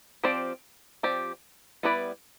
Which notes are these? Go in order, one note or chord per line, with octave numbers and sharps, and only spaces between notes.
F3 C4 G4 D5
F3 C4 G4 D5
G3 B3 E4 B4 D5